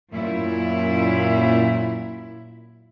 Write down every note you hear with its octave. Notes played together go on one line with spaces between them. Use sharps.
F#2 A#2 E4